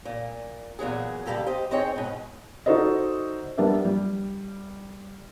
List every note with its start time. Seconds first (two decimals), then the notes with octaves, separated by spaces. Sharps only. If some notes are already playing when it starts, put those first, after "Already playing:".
0.05 A#2
0.79 E2 A#2 F#3 G#4
1.26 C#3 G3 A3 A#3 G4 A4
1.46 G4 C5 D#5
1.71 C4 D#4 G#4 C#5 G5
1.96 G#2 B2
2.66 D#4 F#4 A4 C5 D5 D#5
3.58 G3 B3 D4 G4 A#4 E5
3.85 G3